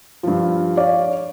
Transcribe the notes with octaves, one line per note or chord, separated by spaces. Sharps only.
G2 F3
C#5 D5 F5